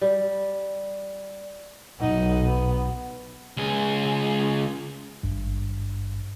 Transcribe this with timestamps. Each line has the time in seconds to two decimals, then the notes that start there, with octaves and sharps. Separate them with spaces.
0.01 G3
2.00 B1 D#4 F#5
2.45 B3
3.57 C#2 G#4
5.23 G#1 G2